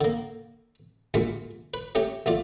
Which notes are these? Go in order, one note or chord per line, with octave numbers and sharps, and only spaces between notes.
D3 A#3
D2 G2 A#2 G#3
B4
A3 C#4 G4 G#5
B1 A3 F4 D5